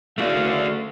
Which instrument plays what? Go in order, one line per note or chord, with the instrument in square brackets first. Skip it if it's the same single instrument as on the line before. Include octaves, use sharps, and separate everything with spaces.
[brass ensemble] F#1 F5 [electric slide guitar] A3 F#4 D5